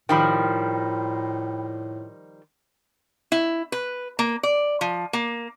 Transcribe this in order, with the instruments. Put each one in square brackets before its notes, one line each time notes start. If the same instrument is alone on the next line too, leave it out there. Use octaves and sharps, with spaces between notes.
[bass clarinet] A2 [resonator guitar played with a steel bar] D#3 F3 G3 [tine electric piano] G5 B5
[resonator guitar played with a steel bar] E4
B4
A#3
D5
F3
A#3